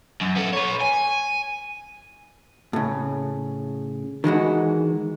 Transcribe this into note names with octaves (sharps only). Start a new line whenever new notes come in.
F#2
B3 A4
B4 C#5
G#5
A2 C#3
D#3 E3 G#3 F#4